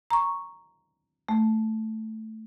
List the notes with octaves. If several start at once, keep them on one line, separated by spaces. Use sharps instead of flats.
A#5 C#6
A3